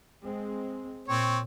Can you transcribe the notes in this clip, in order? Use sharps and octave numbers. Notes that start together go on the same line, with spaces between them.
G#3 C4
A#2 C4 C#5